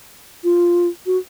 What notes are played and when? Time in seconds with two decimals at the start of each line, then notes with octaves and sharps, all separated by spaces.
0.44 F4
1.06 F#4